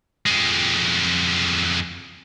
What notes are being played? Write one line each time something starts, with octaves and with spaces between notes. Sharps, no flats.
F2 G#3